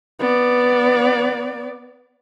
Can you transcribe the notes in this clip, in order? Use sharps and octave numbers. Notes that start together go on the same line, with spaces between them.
B3 D5